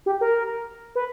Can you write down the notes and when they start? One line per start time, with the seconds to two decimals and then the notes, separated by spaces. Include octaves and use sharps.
0.06 G4
0.21 A#4
0.95 B4